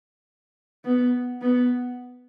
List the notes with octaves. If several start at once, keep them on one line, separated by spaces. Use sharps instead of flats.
B3
B3